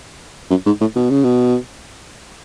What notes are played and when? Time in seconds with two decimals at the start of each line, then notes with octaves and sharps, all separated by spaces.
0.50 F#2
0.66 G#2
0.81 A2
0.96 B2
1.10 C#3
1.24 B2